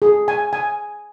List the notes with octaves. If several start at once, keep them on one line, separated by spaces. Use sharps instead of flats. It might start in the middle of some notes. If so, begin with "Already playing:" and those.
G#4
G#5
G#5